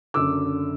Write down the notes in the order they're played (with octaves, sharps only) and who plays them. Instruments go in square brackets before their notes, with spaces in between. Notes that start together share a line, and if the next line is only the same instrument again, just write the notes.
[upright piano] F#1 F#2 D3 D6 E6